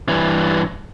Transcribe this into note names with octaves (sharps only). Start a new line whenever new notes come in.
G2 E3